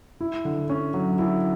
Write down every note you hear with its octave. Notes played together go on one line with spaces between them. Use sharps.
E4
D3
C#4
F#3
E4